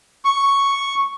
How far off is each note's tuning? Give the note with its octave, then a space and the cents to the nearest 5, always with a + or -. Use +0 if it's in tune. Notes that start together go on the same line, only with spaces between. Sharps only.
C#6 +0